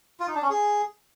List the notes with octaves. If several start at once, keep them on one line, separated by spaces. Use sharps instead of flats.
F4
D#4
D4
C#4
G#4